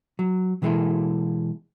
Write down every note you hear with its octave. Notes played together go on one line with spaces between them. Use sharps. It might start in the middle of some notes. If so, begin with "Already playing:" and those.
F#3
B2 E3 G#3 A#3 E4 A4